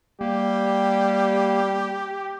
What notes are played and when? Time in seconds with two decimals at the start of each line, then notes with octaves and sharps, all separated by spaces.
0.21 G3 A#3 G4